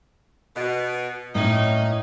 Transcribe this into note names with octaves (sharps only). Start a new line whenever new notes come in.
B2
A2 A#3 C#4 D#4